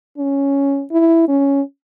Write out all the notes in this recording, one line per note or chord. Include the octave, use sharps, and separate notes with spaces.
C#4
E4
C#4